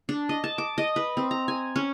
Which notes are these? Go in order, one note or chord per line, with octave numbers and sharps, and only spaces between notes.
D4
D#5
A5
D6
D#5
B4
C4
A#5
G#5
C#4